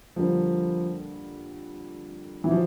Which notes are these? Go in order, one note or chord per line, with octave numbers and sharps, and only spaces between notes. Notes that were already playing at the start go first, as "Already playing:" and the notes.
F2 D3 F3 G3 A#3
D#3 E3 F#3
F3